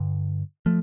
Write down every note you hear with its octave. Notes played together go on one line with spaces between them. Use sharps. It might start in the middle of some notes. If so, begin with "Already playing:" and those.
Already playing: G2 D3
F3 A3